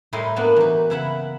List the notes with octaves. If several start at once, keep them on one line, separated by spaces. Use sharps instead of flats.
A2 G3 D#4 E4 D#5 C6
F#3 A#3 B3 D4
E3 D#4
C#3 E4 E5 F#5